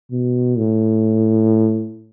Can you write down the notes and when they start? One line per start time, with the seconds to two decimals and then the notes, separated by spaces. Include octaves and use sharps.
0.11 B2
0.58 A2